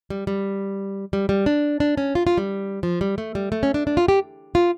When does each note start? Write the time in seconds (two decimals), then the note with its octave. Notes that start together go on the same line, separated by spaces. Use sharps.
0.10 G3
0.27 G3
1.13 G3
1.29 G3
1.46 D4
1.80 D4
1.97 C#4
2.15 F4
2.27 F4
2.38 G3
2.83 F3
3.01 G3
3.18 A3
3.35 G3
3.52 A3
3.63 C#4
3.74 D4
3.87 D4
3.97 F4
4.08 G4
4.55 F4